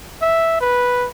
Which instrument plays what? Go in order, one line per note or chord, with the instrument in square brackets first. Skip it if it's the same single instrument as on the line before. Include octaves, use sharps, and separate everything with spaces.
[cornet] E5
B4